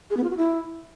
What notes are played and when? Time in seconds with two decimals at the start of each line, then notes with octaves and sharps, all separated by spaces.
0.10 G#4
0.17 B3
0.23 F4
0.30 F#4
0.37 E4